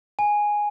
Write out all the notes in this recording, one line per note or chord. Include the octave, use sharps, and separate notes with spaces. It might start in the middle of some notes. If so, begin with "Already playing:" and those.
G#5